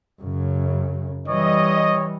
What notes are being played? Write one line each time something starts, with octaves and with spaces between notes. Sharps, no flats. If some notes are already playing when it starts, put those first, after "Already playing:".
F#2 C#3
E3 G3 C#5 D#5